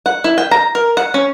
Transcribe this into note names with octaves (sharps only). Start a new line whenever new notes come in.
F#5
E4
G5
A#5
A#4
F#5
C#4